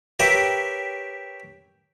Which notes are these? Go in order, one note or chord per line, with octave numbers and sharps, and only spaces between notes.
G4 A#4 B4 C#5 E5 G5